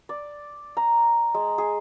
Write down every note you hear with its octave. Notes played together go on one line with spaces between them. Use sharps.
D5
A#5
G#3
G#4